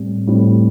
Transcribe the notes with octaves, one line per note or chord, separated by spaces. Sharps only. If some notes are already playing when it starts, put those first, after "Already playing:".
Already playing: A2 G3 C4
A2 G3 C4